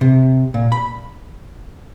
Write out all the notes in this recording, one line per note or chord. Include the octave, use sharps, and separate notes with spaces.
C3
A#2
B5